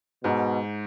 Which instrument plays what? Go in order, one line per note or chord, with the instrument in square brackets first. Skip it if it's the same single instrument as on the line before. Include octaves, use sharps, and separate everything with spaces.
[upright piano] G#2 [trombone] B2